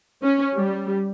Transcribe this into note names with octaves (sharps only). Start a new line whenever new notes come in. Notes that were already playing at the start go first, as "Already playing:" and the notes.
C#4
G3